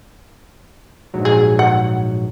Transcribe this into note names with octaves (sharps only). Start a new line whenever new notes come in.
A#1 G#2 F#3
G#4
F#5